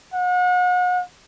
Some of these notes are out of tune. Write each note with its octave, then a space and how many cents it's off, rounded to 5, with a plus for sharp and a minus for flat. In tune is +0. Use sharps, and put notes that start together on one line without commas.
F#5 -40